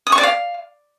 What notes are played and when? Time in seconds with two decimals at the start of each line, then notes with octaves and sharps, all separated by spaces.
0.07 D#6
0.12 C#6
0.18 D5
0.23 F5